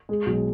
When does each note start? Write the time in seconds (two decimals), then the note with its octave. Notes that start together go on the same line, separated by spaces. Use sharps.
0.09 G#3
0.26 B1